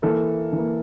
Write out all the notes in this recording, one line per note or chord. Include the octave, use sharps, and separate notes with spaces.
E3 A#3 A4
E3 A#3